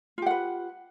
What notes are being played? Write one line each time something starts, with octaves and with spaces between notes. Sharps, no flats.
F4 G4 B4 F#5